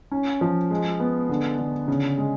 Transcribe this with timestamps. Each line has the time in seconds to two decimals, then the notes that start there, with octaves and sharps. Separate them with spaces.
0.11 C#4
0.41 F3
0.70 G#3
1.00 B3
1.29 D3
1.59 D3
1.88 C#3
2.18 G#3